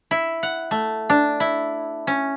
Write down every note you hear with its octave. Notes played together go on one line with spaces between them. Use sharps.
E4
F#5
A3
D4
E4
C#4